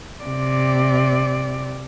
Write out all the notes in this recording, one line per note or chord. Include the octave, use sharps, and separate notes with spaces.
C3 D5